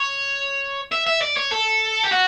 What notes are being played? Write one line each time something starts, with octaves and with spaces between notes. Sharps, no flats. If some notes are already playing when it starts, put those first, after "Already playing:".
Already playing: C#5
E5
E5
D5
C#5
A4
G4
F#4